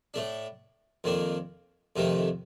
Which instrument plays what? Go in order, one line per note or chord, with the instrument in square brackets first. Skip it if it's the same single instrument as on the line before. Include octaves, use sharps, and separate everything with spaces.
[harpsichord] A2 A3 D4
F2 D#3 A#3 D4
F2 C3 D#3 A3 D#4